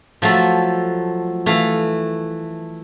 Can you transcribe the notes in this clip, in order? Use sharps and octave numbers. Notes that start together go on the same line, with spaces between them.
F3 F#3 A3 A4
E3 A3 F5